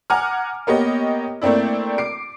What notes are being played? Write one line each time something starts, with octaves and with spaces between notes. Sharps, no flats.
F#5 G#5 A#5 D6 F6
A#3 B3 G4 C#5 D#5
A3 A#3 C4 D4 E4
D6 C7 D7